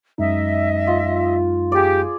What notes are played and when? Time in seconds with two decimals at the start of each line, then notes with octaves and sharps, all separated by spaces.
0.18 F#2 G#3 D#4 D#5 E5
0.87 F4
1.72 G4 G#4 D5